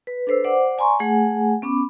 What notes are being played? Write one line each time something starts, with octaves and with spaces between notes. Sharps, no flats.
B4
D4 A4 B4 C5 E6
C5 D5 F#5 D6
D5 G#5 A#5 C6 C#6
A3 G#4 F#5 G#5
B3 C#4 B5 D6